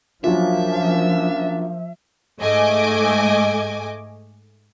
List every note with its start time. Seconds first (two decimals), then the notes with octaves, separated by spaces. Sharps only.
0.24 F3 F#3 A#3 C#4 D4 F4 E5
2.40 G#2 A3 D#5 G#5 D6